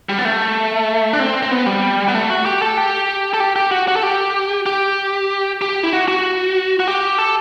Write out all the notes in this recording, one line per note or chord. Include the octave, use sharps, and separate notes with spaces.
G3
B3
A3
D4
C4
C4
B3
G3
B3
A3
F#4
G4
A4
G4
A4
G4
G4
F#4
F#4
A4
G4
G4
G4
E4
F#4
F#4
F#4
G4
A4